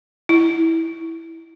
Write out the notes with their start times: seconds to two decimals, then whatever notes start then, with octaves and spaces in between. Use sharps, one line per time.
0.29 E4